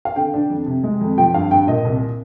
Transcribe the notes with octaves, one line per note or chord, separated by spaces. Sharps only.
F5
D3 G5
D4
F2
C3
G#3
F2
F3 G5
G2 F5
G2 G5
A#2 D#5
C2